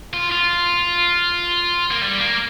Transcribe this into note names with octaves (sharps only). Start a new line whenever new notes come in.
F4
F4
A#3
G3
A#3